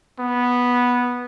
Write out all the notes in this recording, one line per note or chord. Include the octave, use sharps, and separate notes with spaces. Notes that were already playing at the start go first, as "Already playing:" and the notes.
B3